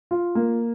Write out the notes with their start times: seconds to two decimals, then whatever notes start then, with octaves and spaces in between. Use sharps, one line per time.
0.11 F4
0.35 A#3